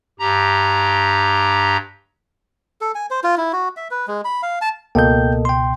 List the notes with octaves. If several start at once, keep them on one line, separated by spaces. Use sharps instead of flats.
G2 G4 A#5
A4
G#5
C5
F4
E4
F#4
E5
B4
G#3
B5
F5
A5
C#2 B2 A#3 A4 D#5 G5 G6
G5 C6